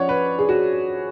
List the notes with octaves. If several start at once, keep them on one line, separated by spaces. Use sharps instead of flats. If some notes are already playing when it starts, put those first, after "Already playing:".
Already playing: F3 C#4 C#5 D5 F#5
B4
G#4
F#4